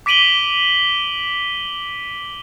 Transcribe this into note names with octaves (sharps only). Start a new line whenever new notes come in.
D6 B6 D7 D#7 F#7 G7